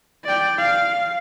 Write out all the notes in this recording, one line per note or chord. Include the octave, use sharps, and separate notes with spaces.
D5 G5
F5